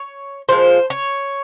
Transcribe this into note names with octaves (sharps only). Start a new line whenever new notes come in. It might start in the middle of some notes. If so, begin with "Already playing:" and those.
Already playing: C#5
A#2 F3 G#3 C5
C#5